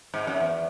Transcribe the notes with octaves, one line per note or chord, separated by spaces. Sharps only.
G#2
F#2
E2